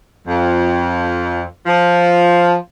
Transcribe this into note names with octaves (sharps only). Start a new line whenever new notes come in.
F2
F3